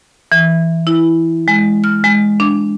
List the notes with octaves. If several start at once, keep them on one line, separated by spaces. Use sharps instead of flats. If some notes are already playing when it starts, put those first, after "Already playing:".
E3
E4
G#3
F6
G#3
D4